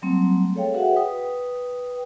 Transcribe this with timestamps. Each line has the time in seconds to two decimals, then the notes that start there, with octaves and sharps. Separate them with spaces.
0.02 F#3 G3 A3 A#3 C4
0.55 G#4 A4 C#5 F5 G5
0.74 F#4 G#4 B4 E5 F#5
0.96 B4 G5 D#6